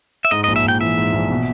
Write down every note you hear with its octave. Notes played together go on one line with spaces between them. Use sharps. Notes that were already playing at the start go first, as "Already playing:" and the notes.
E5
G#2 D#5
A#1 D#5
E5
A#1 G5
E3 E5
G#2
A#1
B2